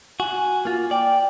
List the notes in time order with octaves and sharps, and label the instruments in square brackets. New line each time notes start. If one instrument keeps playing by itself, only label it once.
[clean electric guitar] F#4 [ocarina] G#5
[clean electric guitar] A#3 F4
[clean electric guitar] D5 [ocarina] G5